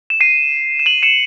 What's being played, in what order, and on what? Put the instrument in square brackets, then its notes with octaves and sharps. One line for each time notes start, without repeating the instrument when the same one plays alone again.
[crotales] E7
C7 D#7
E7
D#7 F#7
C#7 E7